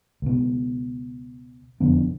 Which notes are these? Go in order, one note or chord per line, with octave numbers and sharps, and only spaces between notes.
C#2 B2
E1 F2 D3 B3